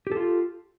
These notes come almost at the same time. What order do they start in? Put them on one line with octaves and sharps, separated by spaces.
G4 A4 F4